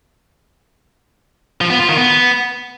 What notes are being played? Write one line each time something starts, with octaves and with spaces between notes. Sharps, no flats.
F3
B3
F4
D#3
B3